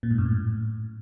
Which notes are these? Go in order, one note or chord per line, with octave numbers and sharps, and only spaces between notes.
A#2
G#2
F#2
A2